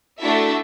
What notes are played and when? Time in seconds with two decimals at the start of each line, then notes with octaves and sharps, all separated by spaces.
0.20 A3 D4 E4 F#4 A4 E5